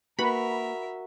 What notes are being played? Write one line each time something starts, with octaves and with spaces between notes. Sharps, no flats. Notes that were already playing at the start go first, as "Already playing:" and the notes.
A#3 F#4 A#4 B4 E5 F#5 B5